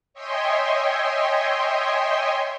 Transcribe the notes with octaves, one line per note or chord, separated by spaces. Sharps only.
C#5 D#5 E5 G5 G#5 C6